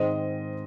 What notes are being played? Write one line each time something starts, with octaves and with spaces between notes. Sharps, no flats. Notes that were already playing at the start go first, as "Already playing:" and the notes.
Already playing: G#2 D#3 G#3 C4 C5 D#5